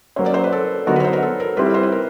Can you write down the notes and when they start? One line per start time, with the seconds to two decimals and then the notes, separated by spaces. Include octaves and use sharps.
0.16 F#3 A#3 C#4 C5
0.26 D5
0.34 C5
0.44 B4
0.52 A4
0.87 D3 F#3 B3 D#4 F#4 A#4
0.96 B4
1.00 C#5
1.04 C5
1.13 A#4
1.23 A4
1.40 A#4
1.57 G3 C4 E4 B4
1.66 C#5
1.74 C5
1.83 B4
1.92 A#4